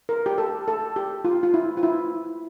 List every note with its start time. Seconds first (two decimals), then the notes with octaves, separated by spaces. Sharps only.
0.09 A#4
0.26 G4
0.38 A4
0.68 A4
0.96 G4
1.25 F4
1.43 F4
1.54 E4
1.77 F4
1.83 E4